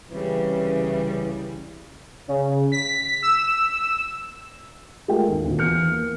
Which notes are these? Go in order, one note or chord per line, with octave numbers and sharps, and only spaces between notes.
C2 C#3 E3 G3
C#3
B6
E6
G#3 A3 F4 A4 A#4 G5
G#1 D#2
D2 A#2
E2 F6 G6 C#7
A#3